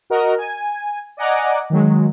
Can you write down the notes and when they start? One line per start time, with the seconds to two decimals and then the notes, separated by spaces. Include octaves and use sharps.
0.10 F#4 A#4 D#5
0.38 G#5
1.17 D5 D#5 F#5 G#5 A#5 D6
1.70 D#3 F#3 G#3